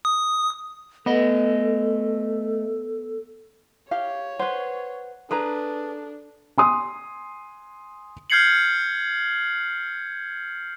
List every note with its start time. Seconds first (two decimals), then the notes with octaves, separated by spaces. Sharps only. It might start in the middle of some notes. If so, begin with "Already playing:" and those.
0.05 D#6
1.06 A3 B3 A4 D#5
3.91 G4 C#5 F5
4.39 B4 C5 F#5
5.31 D4 G#4 A4 B4 A#5
6.58 G#5 C6 D#6
8.30 F6 G6 G#6 C7 C#7 F#7